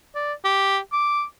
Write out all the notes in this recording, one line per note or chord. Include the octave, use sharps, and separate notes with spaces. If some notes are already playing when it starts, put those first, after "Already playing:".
D5
G4
D6